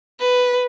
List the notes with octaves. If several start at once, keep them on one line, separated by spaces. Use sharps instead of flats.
B4